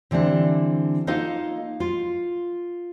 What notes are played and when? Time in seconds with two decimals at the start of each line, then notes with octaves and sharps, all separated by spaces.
0.11 D3 E3 G3 C4 D4
1.07 A#3 D#4 F4 A4 D#5 F5
1.80 F4